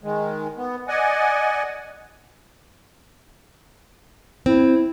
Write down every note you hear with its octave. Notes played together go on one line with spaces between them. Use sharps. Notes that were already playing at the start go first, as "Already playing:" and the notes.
D#3 G#3
B3
D5 D#5 F#5 G#5
C4 E4